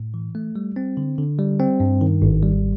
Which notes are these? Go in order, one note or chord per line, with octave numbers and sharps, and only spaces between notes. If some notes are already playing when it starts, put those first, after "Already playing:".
Already playing: A2
E3
A3
G3
C4
D3
D3
G3
C4
G2
D#3
G#1
G3